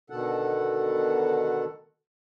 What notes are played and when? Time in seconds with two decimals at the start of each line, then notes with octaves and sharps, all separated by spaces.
0.10 B2 D3 D#3 A4 F#5